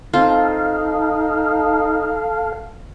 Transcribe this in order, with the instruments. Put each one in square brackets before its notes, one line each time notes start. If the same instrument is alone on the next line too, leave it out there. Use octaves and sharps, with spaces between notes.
[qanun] C4 F4 [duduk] D#4 [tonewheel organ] A4 F5